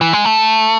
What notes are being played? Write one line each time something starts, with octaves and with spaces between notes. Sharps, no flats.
E3
G#3
A3